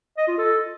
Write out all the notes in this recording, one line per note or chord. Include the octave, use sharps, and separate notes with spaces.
D#5
F4
A4